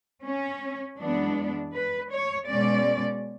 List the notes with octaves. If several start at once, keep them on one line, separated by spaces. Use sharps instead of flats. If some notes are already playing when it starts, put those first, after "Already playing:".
C#4
F#2 E3 G#3 B3 D4
B4
C#5
B2 G#3 C#4 D5